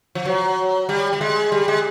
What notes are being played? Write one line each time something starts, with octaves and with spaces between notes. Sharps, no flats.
F3
F#3
G3
G3
G#3
G3
G#3